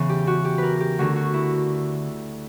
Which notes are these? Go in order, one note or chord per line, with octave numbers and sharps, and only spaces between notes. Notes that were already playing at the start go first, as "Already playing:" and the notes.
Already playing: E2 C#3 E3
G4
F#4
G4
A#4 B4
G4
D2 D3 F#4
F#4
E4